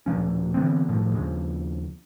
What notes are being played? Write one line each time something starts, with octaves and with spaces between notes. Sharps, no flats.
D#1 B2 F3 C#4
D3 E3 B3 C4
F#1 A2 D#3 F3
D#2 C#3 F3